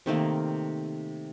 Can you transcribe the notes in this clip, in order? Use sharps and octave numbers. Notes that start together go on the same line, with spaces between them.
C3 D#3 A3 A#3